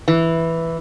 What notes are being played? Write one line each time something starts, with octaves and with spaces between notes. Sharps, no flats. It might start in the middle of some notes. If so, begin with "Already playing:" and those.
E3